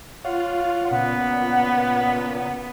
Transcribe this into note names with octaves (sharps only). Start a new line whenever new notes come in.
F4 C#5 F5 F#5
A#2 C#3 B3 F#5